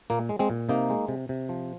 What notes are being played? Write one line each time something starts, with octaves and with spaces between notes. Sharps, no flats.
A#2 A#3
G#3
G#3 C4
A#2
C3 A#3 D#4
G#3
C3
C3
F3